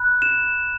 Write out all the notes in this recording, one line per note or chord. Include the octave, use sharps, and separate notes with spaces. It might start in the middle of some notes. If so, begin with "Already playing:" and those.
Already playing: B5 F#6
E7